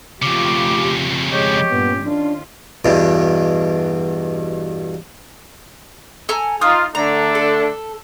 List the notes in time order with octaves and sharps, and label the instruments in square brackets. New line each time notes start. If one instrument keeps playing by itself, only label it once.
[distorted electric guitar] F2 C#3 [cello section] A3 F4 G4 [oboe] D6
[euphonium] G#3 [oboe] G4 [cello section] C#5 D#5
[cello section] G2 A#2 C#4 [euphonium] B3
[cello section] D#3 C#4 F4 [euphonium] D4
[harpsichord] E2 G2 B2
[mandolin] A4 G#5 A#5
[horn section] D#4 F4 [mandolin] D#6 F6
[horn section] D3 A3 D4 [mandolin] A#5
[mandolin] A4